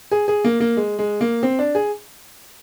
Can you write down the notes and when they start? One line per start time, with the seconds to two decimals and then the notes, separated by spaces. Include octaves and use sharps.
0.11 G#4
0.28 G#4
0.44 A#3
0.60 A#3
0.77 G#3
0.99 G#3
1.21 A#3
1.43 C4
1.59 D4
1.75 G#4